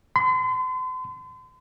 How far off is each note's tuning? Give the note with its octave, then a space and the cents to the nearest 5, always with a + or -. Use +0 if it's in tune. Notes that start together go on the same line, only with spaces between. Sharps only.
C6 -40